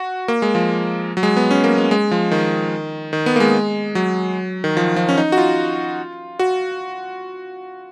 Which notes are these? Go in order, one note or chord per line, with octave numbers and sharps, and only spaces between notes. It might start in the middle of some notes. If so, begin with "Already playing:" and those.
Already playing: F#4
A#3
G#3
F3
F#3
G#3
B3
C#4
A#3
G#3
G#3
F3
D#3
D#3
B3
A#3
G#3
F#3
D#3
F3
F3
C#4
D#4
F#4
F4
F#4